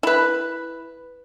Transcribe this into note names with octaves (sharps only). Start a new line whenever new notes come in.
E4 B4